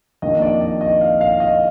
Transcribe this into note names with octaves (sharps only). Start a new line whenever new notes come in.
F2 D#3 A#3 D4 D#5
D5
D#5
D#5
F5
F5
D#5